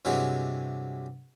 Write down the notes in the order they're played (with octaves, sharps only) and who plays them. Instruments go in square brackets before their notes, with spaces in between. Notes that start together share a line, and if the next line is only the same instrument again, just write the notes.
[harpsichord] G2 C3 E3 F#3 G#3